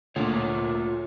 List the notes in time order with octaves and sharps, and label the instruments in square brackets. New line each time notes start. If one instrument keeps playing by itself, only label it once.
[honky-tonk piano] D2 A#2 [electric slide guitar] A3 F4 C#5